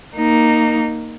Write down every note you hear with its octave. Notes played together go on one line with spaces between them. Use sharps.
A#3 D#4